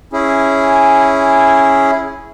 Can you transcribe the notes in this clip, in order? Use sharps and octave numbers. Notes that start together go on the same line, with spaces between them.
C#4 E4 G#4